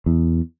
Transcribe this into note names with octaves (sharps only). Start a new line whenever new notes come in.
E2